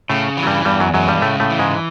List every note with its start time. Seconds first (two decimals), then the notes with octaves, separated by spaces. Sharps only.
0.09 A2 C#3 A3
0.37 E3
0.43 F#3
0.47 G2 G3
0.65 E2 G2 G3
0.80 F#2 F#3
0.94 F#2 F#3 G#3
1.08 G2 G3
1.22 A2 C#3 A3
1.40 A2 A3
1.50 E3
1.59 G#2 G#3